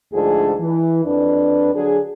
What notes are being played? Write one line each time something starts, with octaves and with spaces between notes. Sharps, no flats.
D2 G#2 F3 D4 G#4 A4
E3
F2 D4 B4
D3 F#3 D4 G#4